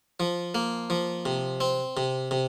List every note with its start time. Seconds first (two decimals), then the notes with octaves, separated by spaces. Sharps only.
0.20 F3
0.55 A#3
0.90 F3
1.26 C3
1.60 C4
1.97 C3
2.31 C3